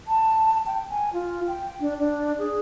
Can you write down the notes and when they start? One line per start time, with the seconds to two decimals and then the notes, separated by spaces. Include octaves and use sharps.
0.08 A5
0.67 G5
0.90 G#5
1.13 F4
1.47 G5
1.81 D4
1.99 D4
2.38 G#4